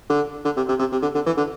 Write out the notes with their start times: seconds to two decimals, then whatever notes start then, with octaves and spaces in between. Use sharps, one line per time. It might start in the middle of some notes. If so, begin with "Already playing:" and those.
0.10 D3
0.45 D3
0.57 C3
0.69 C3
0.79 C3
0.92 C3
1.02 D3
1.15 D3
1.26 E3
1.37 D3